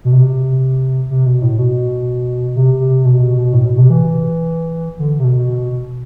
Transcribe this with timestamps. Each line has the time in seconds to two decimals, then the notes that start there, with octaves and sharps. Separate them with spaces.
0.05 B2
0.12 C3
1.10 C3
1.26 B2
1.42 A2
1.59 B2
2.56 C3
2.80 C3
3.05 B2
3.21 B2
3.37 B2
3.53 A2
3.65 B2
3.78 C3
3.90 E3
4.99 D3
5.19 C3
5.24 B2
5.36 B2
5.48 B2